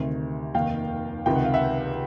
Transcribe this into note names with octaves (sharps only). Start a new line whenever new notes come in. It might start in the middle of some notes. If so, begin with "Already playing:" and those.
Already playing: D2 C3 D#3
F1 D#2 D#3 F5 G5
C#2 C3 D#3 G5
F#5
F5
E5 F#5